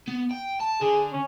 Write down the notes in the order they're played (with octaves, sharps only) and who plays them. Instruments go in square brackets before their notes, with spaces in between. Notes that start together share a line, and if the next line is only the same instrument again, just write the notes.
[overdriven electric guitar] B3
G5
A5
[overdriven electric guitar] D3 [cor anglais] G#4
[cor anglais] C#4